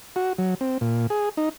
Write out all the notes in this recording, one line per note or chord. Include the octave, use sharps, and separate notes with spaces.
F#4
F#3
C4
A#2
G#4
D#4